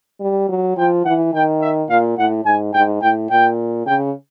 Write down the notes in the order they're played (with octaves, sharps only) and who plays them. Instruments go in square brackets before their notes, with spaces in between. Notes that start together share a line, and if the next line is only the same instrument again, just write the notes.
[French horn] G3
F#3
[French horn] F3 [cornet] G5
[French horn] E3 [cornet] F#5
[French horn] D#3 [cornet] G5
[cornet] E5
[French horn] A#2 [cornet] F5
[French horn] A2 [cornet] F#5
[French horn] G#2 [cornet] G#5
[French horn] G#2 [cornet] G5
[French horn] A2 [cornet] G5
[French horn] A#2 [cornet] G5
[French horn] C#3 [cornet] G5